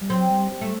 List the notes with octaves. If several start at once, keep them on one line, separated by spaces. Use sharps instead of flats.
G3
F#3 C4
G3
G3
A3